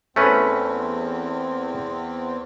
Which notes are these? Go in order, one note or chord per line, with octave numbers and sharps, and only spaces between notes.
E2 A3 C4 C#4 B4